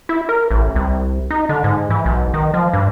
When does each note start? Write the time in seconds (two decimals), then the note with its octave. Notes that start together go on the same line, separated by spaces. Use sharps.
0.09 E4
0.29 A#4
0.51 A1
0.76 C2
1.31 D#4
1.49 D3
1.64 G#2
1.90 E3
2.06 B1
2.34 D#3
2.54 F3
2.73 G2